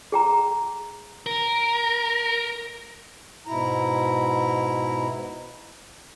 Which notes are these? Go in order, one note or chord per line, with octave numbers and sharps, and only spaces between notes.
G#4 G5 A#5
A#4
G#2 B2 E4 A#5